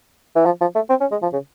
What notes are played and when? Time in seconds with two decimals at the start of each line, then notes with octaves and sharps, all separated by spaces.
0.35 E3
0.46 F3
0.61 F3
0.75 A3
0.90 C4
1.01 C#4
1.11 G#3
1.22 F3
1.33 C#3